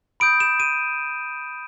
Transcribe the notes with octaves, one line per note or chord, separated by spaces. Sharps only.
B5 D#6 G6 D7
E7
D#7